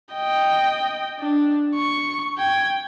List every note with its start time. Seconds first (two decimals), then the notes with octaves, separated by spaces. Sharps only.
0.14 D#5 G5
1.20 D4
1.75 C#6
2.38 G5 G#6